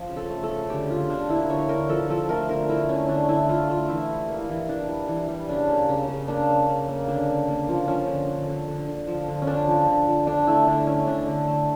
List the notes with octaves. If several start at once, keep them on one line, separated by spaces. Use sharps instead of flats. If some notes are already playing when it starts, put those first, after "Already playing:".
Already playing: F3
C#3
A4
A3
A4
C#3
D3 G4
D3 F4
D3 D4
A#3 E4
D3 C#5
D3 A#4
F3 A4
F3 A4
A3 A#4
D3 A#4
A3 E4
D3 C#4
D3 D4
D3 E4
A3 F4
A3 F4
E3 E4
G3
A#3
E3
E3 D4
G3
E3
G3
C#3 D4
A#3
C#3
C#3
A#3 D4
C#3
C#3
A#3
D3 D4
A#3
A#3
F3
F3 C#4
D3
D3
D3
D3
D3
F3
D3
C#4
D3 D4
F3
D3
F3
D3 D4
A3 E4
D3 D4
A3 C#4
D3 D4
D3
A3